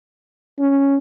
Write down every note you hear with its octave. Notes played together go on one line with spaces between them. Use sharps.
C#4